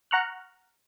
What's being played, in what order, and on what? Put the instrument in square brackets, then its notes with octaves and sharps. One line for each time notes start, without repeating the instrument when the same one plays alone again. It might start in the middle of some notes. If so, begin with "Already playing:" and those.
[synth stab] F#5 A#5 C#6 F6 F#6